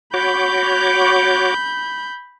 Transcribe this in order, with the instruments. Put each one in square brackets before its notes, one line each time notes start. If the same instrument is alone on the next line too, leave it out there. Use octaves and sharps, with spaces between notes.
[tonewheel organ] F#4 C#5 D6 [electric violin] B5 G6